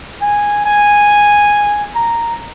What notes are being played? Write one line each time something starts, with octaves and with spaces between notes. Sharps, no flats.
G#5
G#5
A#5